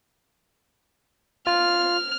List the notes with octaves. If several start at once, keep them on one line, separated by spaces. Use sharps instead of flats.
F4 F6